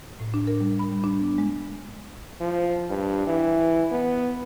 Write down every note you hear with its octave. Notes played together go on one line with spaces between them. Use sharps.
A2
D4
A#4
G3
B5
G3
D4
B3
G#3
F3
G2
E3
B3